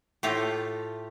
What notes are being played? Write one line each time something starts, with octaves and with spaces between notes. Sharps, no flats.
A2 A3 F4 G4